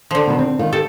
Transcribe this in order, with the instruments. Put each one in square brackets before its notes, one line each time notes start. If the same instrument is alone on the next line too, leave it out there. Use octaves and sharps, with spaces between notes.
[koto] D3 F3
[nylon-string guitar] B2 D#3 B3
C4
D#3 F4
[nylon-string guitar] G4 [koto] A4